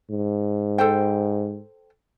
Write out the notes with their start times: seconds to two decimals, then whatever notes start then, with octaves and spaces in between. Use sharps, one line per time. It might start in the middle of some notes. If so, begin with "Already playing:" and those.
0.11 G#2
0.78 A4 C5 G5